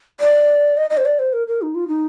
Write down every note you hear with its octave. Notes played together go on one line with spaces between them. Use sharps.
D5
D#5
D#5
C5
D5
C5
A#4
A#4
D#4
F4
D#4